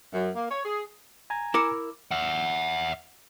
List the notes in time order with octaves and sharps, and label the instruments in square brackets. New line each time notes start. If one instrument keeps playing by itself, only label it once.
[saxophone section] F#2
A#3
C#5
G#4
[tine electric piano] G#5 A#5 G#6
[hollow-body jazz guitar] E4 A#4 [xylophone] D6 C#7 E7
[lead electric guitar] E5 F#5